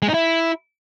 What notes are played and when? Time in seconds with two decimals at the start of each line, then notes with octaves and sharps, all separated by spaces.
0.02 G#3
0.08 D#4
0.14 E4